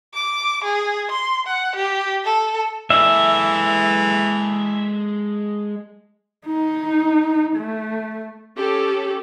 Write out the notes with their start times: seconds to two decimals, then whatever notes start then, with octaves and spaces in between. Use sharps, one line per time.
0.14 D6
0.64 G#4
1.11 C6
1.47 F#5
1.76 G4
2.25 A4
2.90 E3 G#3 A4 E5
6.46 D#4
7.57 A3
8.58 C#4 G4 A4